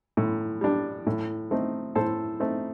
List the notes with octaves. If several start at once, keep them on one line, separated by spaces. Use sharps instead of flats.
A2
G3 D4
A2
A3 C4 D#4
A2 A4 C5
A3 C4 D#4